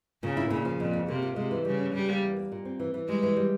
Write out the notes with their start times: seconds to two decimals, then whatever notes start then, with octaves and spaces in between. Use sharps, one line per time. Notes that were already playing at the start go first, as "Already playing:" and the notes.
0.23 A#2 C#3
0.37 E4
0.50 A#2 C#3
0.65 F3
0.80 F2 A#2
0.93 C#3
1.08 C3 A#3
1.22 F4
1.36 C3 G#3
1.51 E3
1.65 C#3 G3
1.80 C#4
1.94 C#3 G3
2.09 A#3
2.22 E2
2.36 A#3
2.52 A#2
2.65 C4
2.80 E3
2.94 E3
3.08 G3 G#3
3.23 E3
3.37 G3